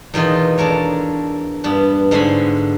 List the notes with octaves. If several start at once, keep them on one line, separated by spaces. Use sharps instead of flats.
E2 B2 D#3 F4 D#5
D4 A4 A#4 C#5
G2 B3 D4
G#2 D3 F#4 F5 G#5 B5